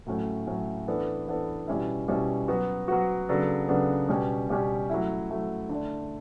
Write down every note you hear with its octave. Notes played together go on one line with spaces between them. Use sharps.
A2 F#3 A3 C#4
A2 F#3 A3 C#4
E3 B3 D4 A4
E3 B3 D4 A4
B2 G3 C#4 E4
B2 G3 C#4 E4
F#3 B3 F#4
F#3 B3 F#4
C#3 F#3 B3 D4 A4
C#3 F#3 B3 D4 A4
B2 G3 C#4 G4
B2 G3 C#4 G4
F#3 A3 E4
F#3 A3 E4
D3 A3 D4